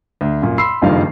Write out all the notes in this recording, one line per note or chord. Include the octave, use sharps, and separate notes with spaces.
D2
F#2 A#2
B5 C6 E6 C7
F#1 G2 D#3 F3 F5